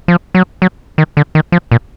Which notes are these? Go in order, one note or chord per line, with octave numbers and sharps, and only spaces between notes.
F3
F#3
F#3
D#3
D3
D#3
F3
A#2